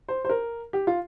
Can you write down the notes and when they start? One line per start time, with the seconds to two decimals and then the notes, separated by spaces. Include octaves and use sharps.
0.08 C5
0.25 C5
0.29 A#4
0.73 G4
0.87 F4